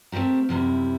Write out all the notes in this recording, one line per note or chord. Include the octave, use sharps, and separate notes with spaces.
A3 C4 C#4 G4 A#4
F#2 C3 G3 E4